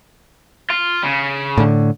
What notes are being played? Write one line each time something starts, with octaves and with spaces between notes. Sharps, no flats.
F4
C#3
A2 D3